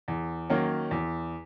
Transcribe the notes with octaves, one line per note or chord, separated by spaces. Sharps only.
E2
D#3 F#3 A#3 C#4
E2